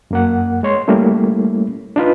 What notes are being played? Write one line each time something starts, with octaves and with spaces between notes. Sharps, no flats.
F#2 A#3 F#5
G#3 C#5 C6
G3 A3 A#3 C#4 E4
D4 D#4 F4 B4